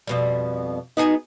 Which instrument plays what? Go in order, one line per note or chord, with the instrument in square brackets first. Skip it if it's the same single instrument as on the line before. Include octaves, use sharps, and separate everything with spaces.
[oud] F2 B2 G3
[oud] B3 F#4 G#4 [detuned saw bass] D#4